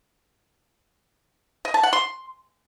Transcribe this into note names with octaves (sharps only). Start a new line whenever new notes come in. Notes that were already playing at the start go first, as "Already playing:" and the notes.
D#5
A5
F#5
C6